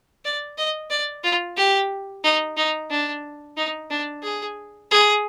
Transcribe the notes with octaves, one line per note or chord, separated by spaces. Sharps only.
D5
D#5
D5
F4
G4
D#4
D#4
D4
D#4
D4
G#4
G#4